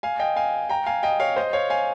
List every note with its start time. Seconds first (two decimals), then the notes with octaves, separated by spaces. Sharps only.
0.03 F5 G#5
0.20 D#5 G5
0.36 F5 G#5
0.69 G5 A#5
0.86 F5 G#5
1.03 D#5 G5
1.20 C#5 F5
1.36 C5 D#5
1.53 C#5 F5
1.70 F5 G#5